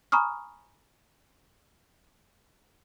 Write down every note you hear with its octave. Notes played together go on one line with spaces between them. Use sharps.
G#5 A#5 B5 C#6 D#6 F6